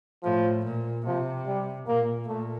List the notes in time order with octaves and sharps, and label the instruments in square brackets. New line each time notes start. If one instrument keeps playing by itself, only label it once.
[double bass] A2 [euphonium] F3
[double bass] A#2
[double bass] C3 [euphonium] F3
[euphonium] G3
[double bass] A#2 [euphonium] A#3
[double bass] A#2 [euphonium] A3